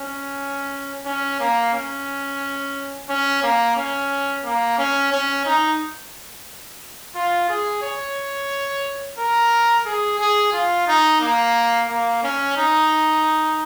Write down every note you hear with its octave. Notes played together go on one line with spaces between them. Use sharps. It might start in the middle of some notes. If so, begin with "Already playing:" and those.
Already playing: C#4
C#4
A#3
C#4
C#4
A#3
C#4
A#3
C#4
C#4
D#4
F4
G#4
C#5
A#4
G#4
G#4
F4
D#4
A#3
A#3
C#4
D#4